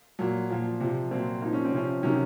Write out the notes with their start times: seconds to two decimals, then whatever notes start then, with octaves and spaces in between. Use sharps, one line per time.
0.19 A#2 F#3
0.49 A#2 F3
0.80 C3 F3
1.11 A#2 F#3 C4
1.42 A#2 F3 D#4
1.53 C#4
1.65 C4
1.72 C3 F3 C#4
2.03 C3 D#3 F#3 C#4